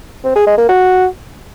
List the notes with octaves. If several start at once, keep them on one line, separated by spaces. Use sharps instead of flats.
C4
G#4
G#3
A#3
F#4